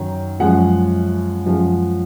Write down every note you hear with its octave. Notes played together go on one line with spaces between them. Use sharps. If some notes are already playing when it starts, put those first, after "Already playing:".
Already playing: F#2 D#3 F#3
F#2 F3 G#3 F#5
F#2 F3 G#3